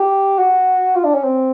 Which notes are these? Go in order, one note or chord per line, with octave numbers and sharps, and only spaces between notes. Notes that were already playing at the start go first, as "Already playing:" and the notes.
Already playing: G4
F#4
F4
D4
C#4
C4